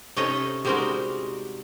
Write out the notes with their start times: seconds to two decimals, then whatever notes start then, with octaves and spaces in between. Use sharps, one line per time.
0.17 C3 C#4 D#4 A4 D#5
0.65 G3 G#3 C4 D#4 F#4 A#4